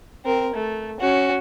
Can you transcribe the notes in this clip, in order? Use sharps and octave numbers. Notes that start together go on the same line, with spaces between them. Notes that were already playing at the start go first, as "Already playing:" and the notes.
C4 A#4
A3
C#4 F#4